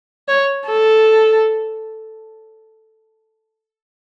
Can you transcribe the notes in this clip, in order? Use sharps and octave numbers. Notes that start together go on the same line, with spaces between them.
C#5
A4